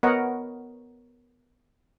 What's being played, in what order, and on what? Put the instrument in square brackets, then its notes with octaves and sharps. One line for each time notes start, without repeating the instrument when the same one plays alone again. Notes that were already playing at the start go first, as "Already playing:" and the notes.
[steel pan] B3 A#4 C#5 D#5 F#5